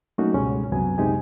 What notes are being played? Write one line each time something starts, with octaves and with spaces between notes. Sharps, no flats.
F#3 A3 A#3 C#4 D#4 F#4
C#2 G#2 B2 G3 G#3 C#4
C2 F#2 C3 F#3 B3 G#5
F#2 C3 G#3 D#4 G4 G#5